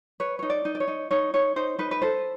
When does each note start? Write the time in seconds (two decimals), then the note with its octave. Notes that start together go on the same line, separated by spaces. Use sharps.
0.20 B4 C#5
0.39 D#4 C#5
0.50 D5
0.65 D#4
0.75 D5
0.80 C#5
0.88 D#4
1.11 D#4 C#5
1.34 D#4 C#5
1.56 D#4 C5
1.79 D#4 B4
1.91 B4
2.02 A4 C5